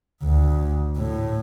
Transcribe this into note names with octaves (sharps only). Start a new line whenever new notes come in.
D2
A2